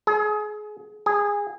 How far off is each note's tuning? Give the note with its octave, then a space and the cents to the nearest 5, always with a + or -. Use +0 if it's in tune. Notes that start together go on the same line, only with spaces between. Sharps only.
G#4 +25
G#4 -20